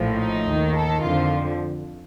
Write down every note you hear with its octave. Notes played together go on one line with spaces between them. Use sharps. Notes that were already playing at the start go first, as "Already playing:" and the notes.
Already playing: A#1 A2 F3
D#4
D#2 D#3
A4
F2 D3 F3 F4